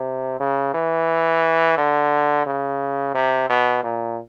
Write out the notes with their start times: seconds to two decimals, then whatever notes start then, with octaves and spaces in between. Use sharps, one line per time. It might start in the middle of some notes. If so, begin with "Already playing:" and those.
Already playing: C3
0.40 C#3
0.74 E3
1.77 D3
2.46 C#3
3.15 C3
3.49 B2
3.83 A#2